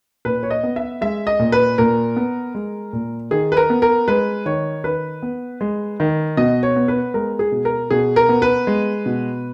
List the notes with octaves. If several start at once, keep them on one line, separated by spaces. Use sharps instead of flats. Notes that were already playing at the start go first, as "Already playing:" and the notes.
A#2 B4
C#5
D#5
B3
E5
G#3 E5
D#5
A#2
B4
A#2 A#4
B3
G#3
A#2
D#3 G#4
B4
A#4
B3
A#4
G#3 B4
D#3 C#5
D#3 B4
B3
G#3
D#3
B2 D#5
C#5
B3
B4
G#3 A#4
G#4
B2
A#4
B2 G#4
A#4
B3
B4
G#3
B2